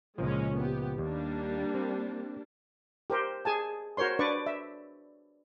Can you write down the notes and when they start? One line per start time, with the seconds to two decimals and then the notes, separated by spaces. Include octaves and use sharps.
0.18 C#2 A#2 F3 G#3 C#4
0.58 B3 G4
0.98 D#2 G3 A#3 D4
1.74 C4
3.10 G4 A#4 C5
3.45 G#4 G#5 A5
3.97 F#4 A#4 C5 C#5 C6
4.19 D4 B4 D5 C#6
4.46 E5